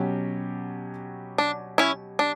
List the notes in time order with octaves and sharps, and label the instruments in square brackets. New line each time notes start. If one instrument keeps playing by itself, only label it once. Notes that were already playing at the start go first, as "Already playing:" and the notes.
Already playing: [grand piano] B2 F#3 C#4 G4
[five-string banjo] D4
C#4 E4
D4